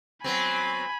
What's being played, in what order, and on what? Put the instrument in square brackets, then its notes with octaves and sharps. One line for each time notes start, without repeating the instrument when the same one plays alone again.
[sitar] F#3 B3 C4 [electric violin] G#5 B5